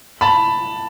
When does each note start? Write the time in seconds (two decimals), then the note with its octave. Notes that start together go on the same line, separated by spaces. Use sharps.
0.21 A5 B5